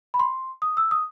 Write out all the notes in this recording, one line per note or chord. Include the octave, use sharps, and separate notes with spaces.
B5
C6
D#6
E6
D#6